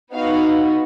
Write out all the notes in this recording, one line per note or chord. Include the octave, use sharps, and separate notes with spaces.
B3 D#4 F#4 F5